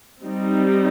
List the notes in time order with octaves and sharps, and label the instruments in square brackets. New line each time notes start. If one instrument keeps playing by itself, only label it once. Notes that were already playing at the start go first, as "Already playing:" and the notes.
[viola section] G3 C4 D#4